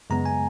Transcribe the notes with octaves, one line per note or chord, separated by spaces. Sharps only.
F#2 C#3 G#3 B3 A#5
G#5